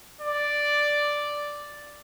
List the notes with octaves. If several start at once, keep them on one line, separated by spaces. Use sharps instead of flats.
D5